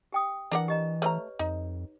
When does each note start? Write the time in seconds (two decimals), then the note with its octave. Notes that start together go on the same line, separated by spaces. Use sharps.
0.12 G4 G5 D#6
0.51 E3 D4 A#4 F#5
0.68 G4 D#5 A#5
1.02 A3 G4 B4 C#5 D#5 A#5
1.39 F2 D#4